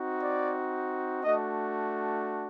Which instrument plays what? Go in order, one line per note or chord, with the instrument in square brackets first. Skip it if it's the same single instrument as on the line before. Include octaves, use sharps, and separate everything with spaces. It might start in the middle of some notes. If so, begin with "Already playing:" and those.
Already playing: [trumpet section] C4 D#4 F#4
D5
A3 D4 F#4 D#5